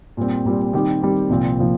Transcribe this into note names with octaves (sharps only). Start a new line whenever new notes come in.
A#2 G3 C4
A#2 G3 C4
D#3 G3 C4 G4
D#3 G3 C4 G4
C2 A#2 F3 C4
A#2 F3